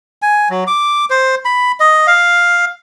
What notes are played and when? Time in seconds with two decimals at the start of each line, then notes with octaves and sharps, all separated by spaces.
0.22 G#5
0.50 F#3
0.67 D6
1.10 C5
1.45 B5
1.80 D#5
2.07 F5